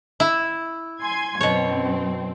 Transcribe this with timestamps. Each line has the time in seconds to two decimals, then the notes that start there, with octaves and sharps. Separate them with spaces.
0.20 E4
1.01 G#5 C6 G#6
1.41 F#2 B2 C4 C#5